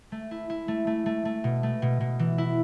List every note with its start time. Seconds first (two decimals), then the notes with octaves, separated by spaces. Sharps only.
0.12 A3
0.31 E4
0.50 E4
0.68 A3
0.87 A3
1.06 A3
1.25 A3
1.44 B2
1.63 A3
1.82 B2
2.00 B2
2.19 E3
2.38 E4